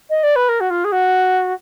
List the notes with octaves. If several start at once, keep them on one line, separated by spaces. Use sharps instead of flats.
D#5
D5
B4
A#4
F#4
F4
G#4
F#4